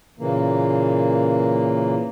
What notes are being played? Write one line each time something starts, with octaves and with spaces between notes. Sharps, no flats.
A#2 C#3 E3 A#3